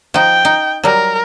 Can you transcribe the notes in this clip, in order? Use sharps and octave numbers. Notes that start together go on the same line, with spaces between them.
F3 D#4 G5
D#4
F#3 G3 A#4